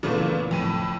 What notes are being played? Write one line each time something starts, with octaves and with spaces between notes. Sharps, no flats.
A#2 C#3 E3 A3 B3
F2 A2 D#7